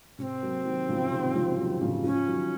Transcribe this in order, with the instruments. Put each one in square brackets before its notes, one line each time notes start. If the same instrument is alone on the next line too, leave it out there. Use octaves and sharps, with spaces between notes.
[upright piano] C3 [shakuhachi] C#4
[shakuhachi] C4
[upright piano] F#3 A#3
D#3 F#3
C#3 F3
C3 D#3
C#3 F3
D#3 F#3
A#2 C#3
[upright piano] C#3 F3 [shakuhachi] C#4
[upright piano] D#3 F#3